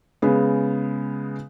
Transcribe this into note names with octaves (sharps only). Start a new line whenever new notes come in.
C#3 G#3 B3